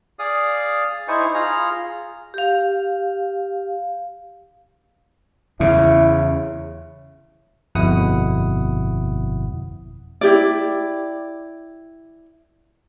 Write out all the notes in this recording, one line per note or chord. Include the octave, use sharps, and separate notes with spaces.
G#4 D5 F5 D#6
D#4 E4 C5 G#5 C#6
F4 G#4 A#5
G4 F5
E2 C#3 E4
G1 F2 B2 E4 F#5 D#6
E4 G4 D5